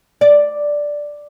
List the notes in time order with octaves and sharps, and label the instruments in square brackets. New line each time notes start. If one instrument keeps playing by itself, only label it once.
[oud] D5